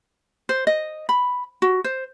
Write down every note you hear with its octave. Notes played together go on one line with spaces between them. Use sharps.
C5
D#5
B5
F#4
C5